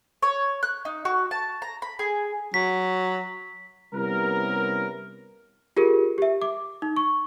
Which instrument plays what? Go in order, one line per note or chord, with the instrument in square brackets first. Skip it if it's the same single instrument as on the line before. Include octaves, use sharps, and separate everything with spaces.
[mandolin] C#5
F#6
D#4
F#4
A5
A#5
B5
G#4
[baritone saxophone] F#3 [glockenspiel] B6
[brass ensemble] C3 G3 B3 C#4 E4 A#4
[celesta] F4 G4 G#4 A#4
G4 E5
D6
D#4
C#6